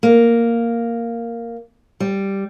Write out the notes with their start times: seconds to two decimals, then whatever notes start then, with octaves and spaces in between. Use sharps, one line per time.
0.03 A#3
2.00 G3